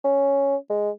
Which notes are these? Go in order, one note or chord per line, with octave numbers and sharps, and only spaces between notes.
C#4
G#3